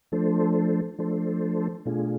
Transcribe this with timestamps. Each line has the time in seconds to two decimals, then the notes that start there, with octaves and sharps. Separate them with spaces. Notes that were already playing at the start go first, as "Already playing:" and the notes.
0.12 F3 A3 D4 A4 C5
0.98 F3 A3 D4 A4 C5
1.85 B2 A3 D4 F4 G#4